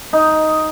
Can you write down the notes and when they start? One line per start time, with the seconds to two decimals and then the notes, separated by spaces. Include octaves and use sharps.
0.13 D#4